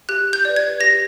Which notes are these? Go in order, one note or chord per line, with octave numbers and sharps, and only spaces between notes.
G4 F#6
G6
B4 D5
G#6
G4 A#6